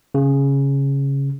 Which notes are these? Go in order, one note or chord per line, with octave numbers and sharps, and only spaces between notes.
C#3